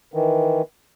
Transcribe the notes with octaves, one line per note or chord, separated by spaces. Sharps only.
D#3 E3